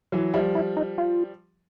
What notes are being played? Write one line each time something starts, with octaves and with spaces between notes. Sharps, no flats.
E3 F#3
F3 G3 E4
E4
D#4
F4